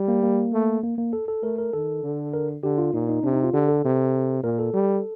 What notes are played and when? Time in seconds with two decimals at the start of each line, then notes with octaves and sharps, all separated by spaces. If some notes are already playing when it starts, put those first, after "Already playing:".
Already playing: G3
0.08 A#3
0.23 A#3
0.53 A3
0.83 A#3
0.98 A#3
1.13 A4
1.28 A4
1.43 A3 A#4
1.58 A#4
1.73 D#3 A4
2.03 D3
2.34 A#4
2.63 D3 G4
2.78 F4
2.93 A#2 D#4
3.09 D#4
3.23 C3 D4
3.33 D#4
3.44 F4
3.53 D3 G4
3.69 A4
3.84 C3
4.43 A#2 A#4
4.59 A4
4.73 G3